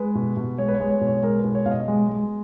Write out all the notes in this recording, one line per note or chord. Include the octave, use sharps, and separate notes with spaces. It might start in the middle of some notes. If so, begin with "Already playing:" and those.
Already playing: G#3 B4
B2
B2
G#3 C#5
B4
C#5
G#3
C#5
B2
C#5
G#3 A#4
B2 B4
C#5
B2 F5
D#5
G#3
G#3